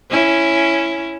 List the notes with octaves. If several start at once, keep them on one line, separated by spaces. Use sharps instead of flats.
C#4 E4